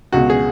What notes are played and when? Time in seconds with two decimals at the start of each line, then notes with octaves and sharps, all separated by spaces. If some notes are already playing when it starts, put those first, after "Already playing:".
0.13 C#2 B2 F#4
0.30 G#4